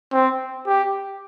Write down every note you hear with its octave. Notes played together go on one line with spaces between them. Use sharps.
C4
G4